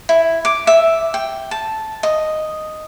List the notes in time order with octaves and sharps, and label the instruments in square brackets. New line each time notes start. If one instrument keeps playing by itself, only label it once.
[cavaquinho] E4
D6
E5
G5
A5
D#5